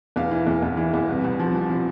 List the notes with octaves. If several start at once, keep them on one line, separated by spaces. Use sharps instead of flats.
E2 F5
E3
E2
E2
E3
E2
C2
C2
F3
C2
F3